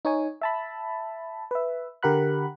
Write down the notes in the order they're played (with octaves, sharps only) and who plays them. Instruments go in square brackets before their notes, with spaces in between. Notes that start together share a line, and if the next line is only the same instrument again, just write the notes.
[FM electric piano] D#4 C#5 G#5
E5 A5 B5
B4 E5
D3 G4 A#4 F#5 B5 F#6